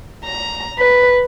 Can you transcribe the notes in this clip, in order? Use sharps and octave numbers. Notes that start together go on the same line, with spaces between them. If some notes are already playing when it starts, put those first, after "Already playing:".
A#5
B4